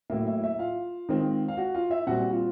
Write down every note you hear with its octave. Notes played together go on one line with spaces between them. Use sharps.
A2 F#3 A#3 E4 E5
E4 E5
E4 E5
F4 F5
D#3 G#3 C4
F5
F#4 F#5
F4 F5
E4 E5
A#2 G3 C4 F#4 F#5
F4 F5